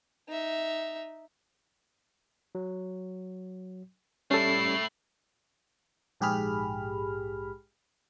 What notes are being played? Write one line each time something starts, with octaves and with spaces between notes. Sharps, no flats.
D#4 E5
F#3
G3 A3 C#4 E4 A4 C7
A#1 G#2 G4 G#4 B5 F6